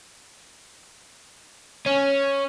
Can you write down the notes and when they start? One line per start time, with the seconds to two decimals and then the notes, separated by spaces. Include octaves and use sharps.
1.86 C#4